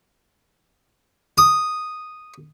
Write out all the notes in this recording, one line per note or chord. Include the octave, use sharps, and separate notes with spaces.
D#6